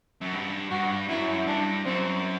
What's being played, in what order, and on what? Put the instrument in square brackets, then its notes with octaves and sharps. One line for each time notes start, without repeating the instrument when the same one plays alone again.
[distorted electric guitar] F#2
G2
[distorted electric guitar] G2 [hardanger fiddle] F#4
[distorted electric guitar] F#2 [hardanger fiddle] E4
[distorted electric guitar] G2 [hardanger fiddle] D4
[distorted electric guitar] F#2 [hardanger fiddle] C4